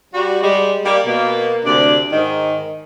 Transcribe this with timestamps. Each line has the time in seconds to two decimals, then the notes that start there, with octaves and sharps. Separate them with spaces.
0.14 G3 F#4
0.42 G3 G#3
0.85 G3 A#3
1.05 B2 A#3
1.65 D2 C3 D4 D5
2.12 G#2 D#3